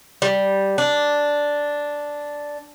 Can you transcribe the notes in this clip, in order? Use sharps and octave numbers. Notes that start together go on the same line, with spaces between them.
G3
D4